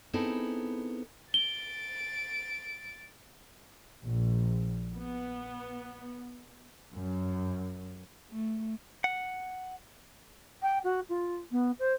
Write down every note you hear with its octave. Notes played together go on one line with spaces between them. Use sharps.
B3 C4 D#4 E4 G#4 A4
A6 D7 G7
A#1
B3
F#2
A3
F#5
G5
F#4
F4
B3
C5